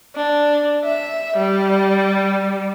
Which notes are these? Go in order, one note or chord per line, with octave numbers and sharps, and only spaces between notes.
D4
E5
G3